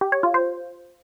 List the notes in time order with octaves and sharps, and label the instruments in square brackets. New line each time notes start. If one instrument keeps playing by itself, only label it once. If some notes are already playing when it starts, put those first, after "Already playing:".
[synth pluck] G4
C#5
F4
C5